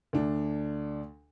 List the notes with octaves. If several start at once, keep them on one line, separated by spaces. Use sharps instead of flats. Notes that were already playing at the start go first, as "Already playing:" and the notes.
D2 D4